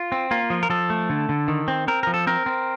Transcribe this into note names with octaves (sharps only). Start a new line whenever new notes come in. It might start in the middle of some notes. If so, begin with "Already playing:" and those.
Already playing: F4
C4
A#3 F4
F3
A#4
F3 A4
A3
D3
D3
D#3
C4
C4 A#4
F3 A#4
A4
C4 A#4
C4